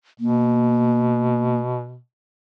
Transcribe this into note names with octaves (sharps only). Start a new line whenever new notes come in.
B2 A#3